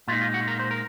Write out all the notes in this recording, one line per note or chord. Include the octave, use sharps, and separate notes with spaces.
A#2 G#3 D#4 F4
F4
F#4
A#4
C5
A#4